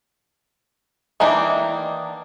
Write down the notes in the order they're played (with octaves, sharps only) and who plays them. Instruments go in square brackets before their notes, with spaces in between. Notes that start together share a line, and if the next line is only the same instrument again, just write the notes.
[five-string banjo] D#3 E3 A#3 D4 D#4